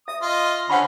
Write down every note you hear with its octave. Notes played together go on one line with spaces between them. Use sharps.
E5 D#6
F4 D#5
D3 C#4 C#5 F#5 B5